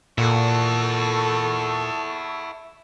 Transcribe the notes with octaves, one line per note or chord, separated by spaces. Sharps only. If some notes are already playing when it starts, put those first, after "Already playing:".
A#2 E4 A4 F#5 C#6